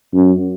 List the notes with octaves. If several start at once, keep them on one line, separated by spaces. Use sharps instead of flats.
F#2